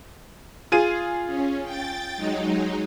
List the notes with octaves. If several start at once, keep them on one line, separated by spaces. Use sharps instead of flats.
F4 G#4 D#7
C#4
G5 A6
F#3 G#3 D#4